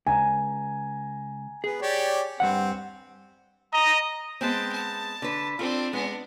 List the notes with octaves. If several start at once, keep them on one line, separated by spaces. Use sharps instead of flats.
C#2 G#5 A#5
B3 G#4
G4 C#5 D5
G2 B2 C4 F#5
D#5 A#5
G#3 B3 C4 G5 A5
A5
D3 B4
C4 D4 F4 A4
G#3 B3 D4